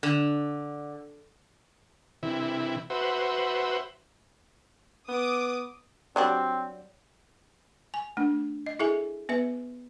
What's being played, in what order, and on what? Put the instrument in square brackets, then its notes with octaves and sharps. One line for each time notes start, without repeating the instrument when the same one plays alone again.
[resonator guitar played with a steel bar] D3
[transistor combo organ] C3 E3 E4
F#4 B4 C5 E5
[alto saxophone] B3 [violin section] D6 D#6
[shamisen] F#3 G3 D4 [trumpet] C4
[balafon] G#5
A3 D4
D#5
E4 G#4 A4 E5 G#5
B3 B4 E5